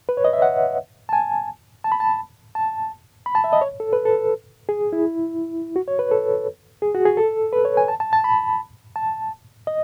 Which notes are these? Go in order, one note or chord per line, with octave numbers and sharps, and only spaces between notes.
B4
C#5
D#5
E5
F#5
A5
G#5
A5
B5
A5
A5
B5
A5
E5
D#5
C#5
A4
B4
A4
G#4
E4
F#4
C#5
B4
A4
G#4
F#4
G#4
A4
B4
C#5
G#5
A5
A5
A5
B5
A5
D#5